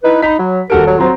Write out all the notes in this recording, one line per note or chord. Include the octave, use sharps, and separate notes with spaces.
D#4 E4 B4
D#4 B5 B6
F#3
D#1 F#4 G4 A4 A#4 D7
F#3
F#3 C4 F4 C5 A#5